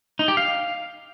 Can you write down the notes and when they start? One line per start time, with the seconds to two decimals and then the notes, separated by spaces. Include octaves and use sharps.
0.19 D#4
0.28 G4
0.37 F5